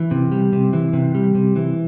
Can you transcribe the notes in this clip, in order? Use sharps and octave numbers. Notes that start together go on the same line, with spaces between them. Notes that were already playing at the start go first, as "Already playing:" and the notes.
Already playing: E3
C3
G3
C3
E3
C3
G3
C3
E3